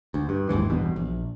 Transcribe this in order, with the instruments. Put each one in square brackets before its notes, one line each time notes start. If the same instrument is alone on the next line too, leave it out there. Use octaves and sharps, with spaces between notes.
[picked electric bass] D2
G2
F#1 D#2 G#2 E3
A1 E2 G2 B2
A#1